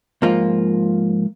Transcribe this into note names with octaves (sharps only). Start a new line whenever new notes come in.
G#2 F3 A#3 F4